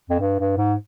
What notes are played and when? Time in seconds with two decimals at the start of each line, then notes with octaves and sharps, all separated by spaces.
0.10 F2
0.20 G2
0.39 G2
0.57 G#2